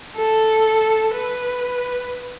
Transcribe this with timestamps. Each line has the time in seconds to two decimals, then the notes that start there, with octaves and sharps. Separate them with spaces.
0.16 A4
1.15 B4